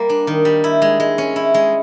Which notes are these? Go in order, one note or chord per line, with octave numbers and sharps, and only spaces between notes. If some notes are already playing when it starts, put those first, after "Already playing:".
Already playing: G3 A#3
D4
D#3
G3
E4
G#3
G#3
C#4
E4
G#3